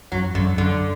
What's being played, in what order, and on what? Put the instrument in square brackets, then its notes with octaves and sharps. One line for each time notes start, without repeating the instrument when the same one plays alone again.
[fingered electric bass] F#2 [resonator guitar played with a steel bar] F#3
[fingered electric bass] F#2 [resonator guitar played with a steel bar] D3
[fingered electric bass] F#2 [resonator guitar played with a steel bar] D3